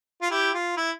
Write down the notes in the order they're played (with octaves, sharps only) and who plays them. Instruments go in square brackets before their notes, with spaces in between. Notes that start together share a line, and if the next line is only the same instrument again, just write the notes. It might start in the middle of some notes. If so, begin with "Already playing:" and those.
[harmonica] F4
E4 G4
F4
E4